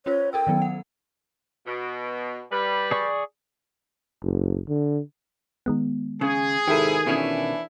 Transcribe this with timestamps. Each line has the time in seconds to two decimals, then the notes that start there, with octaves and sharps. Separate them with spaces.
0.06 C#4 F4 C5 C#5
0.33 A4 A#4 G5 E6
0.47 D#3 F#3 B3
0.62 F#5
1.67 B2
2.51 G3 B4
2.91 G#4 D5 C#6
4.23 F#1
4.69 D3
5.66 D#3 G#3 B3
6.21 C#3 G#4
6.68 G#2 C3 D#3 E4 G4 A4
7.06 B2 D#3 E3 C#4 D4 E4